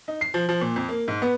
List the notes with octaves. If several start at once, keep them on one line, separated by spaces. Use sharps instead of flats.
D#4
C7
F3
F3
A#2
F2
A#3
G#2
B3